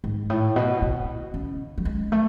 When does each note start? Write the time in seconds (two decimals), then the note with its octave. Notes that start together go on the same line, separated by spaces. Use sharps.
0.04 G#2
0.30 A2
0.56 B2
0.82 B2
1.34 C#3
1.78 F#3
1.85 G#3
2.12 A3